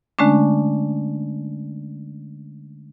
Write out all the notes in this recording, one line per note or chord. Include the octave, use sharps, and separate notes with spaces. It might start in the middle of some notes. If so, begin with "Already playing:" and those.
D3 G#3 A3 C#4 D4